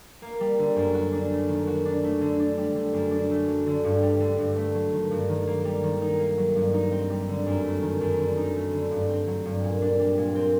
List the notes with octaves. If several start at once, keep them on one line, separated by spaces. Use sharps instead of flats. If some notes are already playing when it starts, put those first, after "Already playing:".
A#3
G3
D3
F#2
F#4
D4
A3
D#3
F#4
D4
A3
D3
D4
G3
D3
F#2
D4
A3
F#3
D3
G2
G3
D3
G2
A3
F#3
D#3
G2
D#3
A#3
G3
D#3
D#4
A#3
F#3
G2
D#4
C4
G3
D3
F#2
A3
D#3
F#2
D3
D#4
A3
D3
G2
C4
F#3
G2
A#2
D4
G3
A#2
C4